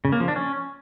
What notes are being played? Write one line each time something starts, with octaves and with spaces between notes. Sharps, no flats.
C#3
A#3
F3
D4
C#4